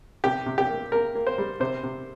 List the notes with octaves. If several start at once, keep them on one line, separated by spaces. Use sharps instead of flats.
C3 G4
C3
G4
A#3
A#3 A#4
A#3
C5
G3
C3 C5
C3